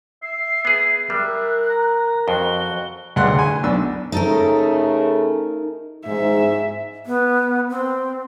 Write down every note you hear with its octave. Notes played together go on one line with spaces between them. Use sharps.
E5 C7
B3 G#4 C7
G3 A#4 E5 F#6
A#5
F2 F#4 G7
D2 G2 C#3 F#5 C6 F#6
G#5
B1 D4 E6
C#3 A3 D#4 A4 A#4
G#2 E5
B3
C4